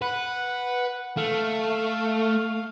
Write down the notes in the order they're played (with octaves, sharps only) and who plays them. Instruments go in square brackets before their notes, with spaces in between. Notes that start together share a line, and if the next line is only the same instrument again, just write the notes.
[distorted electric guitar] B4 [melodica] F#5
[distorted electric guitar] A3 [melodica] F5